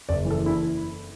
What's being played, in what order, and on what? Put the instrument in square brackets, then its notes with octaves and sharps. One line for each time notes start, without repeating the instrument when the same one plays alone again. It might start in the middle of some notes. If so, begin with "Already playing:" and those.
[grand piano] F#1 D5
E3
A4
E4